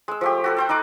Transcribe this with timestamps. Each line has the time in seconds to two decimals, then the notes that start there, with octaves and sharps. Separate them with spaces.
0.08 G#3 E6
0.21 F3 A3 G4
0.44 F#4 A4 B4
0.57 A4 C5 G5
0.69 D#4 D#5 F#5 D6